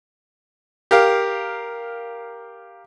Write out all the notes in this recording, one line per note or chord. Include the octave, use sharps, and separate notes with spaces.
G4 A#4 F5